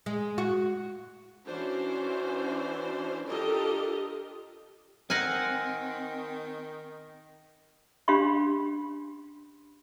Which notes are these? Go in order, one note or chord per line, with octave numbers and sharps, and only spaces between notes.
G#3
F#4
E3 C#4 D4 F#4 C5
D4 F4 G4 A4 A#4 D#5
D#3 C4 F#5 G#5 F6 A#6
C#4 D4 G4 F5 B5 C6